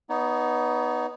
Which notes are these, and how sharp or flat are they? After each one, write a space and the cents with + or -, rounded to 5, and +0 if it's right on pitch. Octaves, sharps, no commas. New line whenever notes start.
B3 +0 D#4 +0 C#5 +40